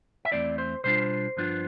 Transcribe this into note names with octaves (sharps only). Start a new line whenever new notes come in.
E5
E2 B2 A3 C4 E4 D5
C5
B2 G3 D4 F4 C5
G2 F3 B3 D4 F4